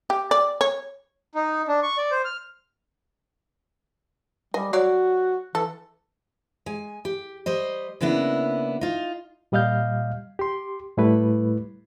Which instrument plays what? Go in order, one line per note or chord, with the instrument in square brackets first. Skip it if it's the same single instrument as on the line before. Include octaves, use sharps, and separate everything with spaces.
[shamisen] G4
D5
C#5
[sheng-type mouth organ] D#4
D4
C#6
D5
C5
F6
[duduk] G3 [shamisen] D#5 G#5
[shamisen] F#3 C#5 D5 [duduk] F#4
[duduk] E3 [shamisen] A4
[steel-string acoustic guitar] G#3 G#5
G4
G3 C5 D#5
C#3 A#3 B3 D4 E4
D#4 F4
[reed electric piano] A#2 G3 D#5 F5 F6 G6
G4 C6
A2 G3 A3 E4 B4